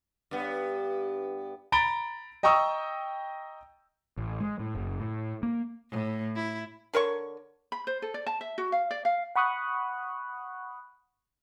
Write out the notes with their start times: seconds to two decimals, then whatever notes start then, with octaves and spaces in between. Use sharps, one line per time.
0.31 G2 B3
1.72 A#5 B5 A6 D7 G7
2.43 D#5 G5 A#5 C#6 D#6 E6
4.17 A1
4.40 G#3
4.59 A2
4.75 F#1
5.00 A2
5.43 A#3
5.91 A2
6.36 E4
6.94 D3 A#4 C#5 C#6
7.72 B5
7.87 C5
8.02 A4
8.14 D5
8.26 A5
8.41 E5
8.58 F#4
8.72 F5
8.91 D5
9.05 F5
9.36 F#5 B5 C#6 D#6 F#6